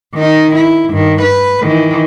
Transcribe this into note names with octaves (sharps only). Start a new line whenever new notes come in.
D#3 D#4
E4
G2 D#3
B4
D#3 E3